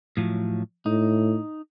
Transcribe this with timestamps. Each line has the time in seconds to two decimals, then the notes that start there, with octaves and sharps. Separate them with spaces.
0.17 A2 F3 F#3
0.86 A2 D#4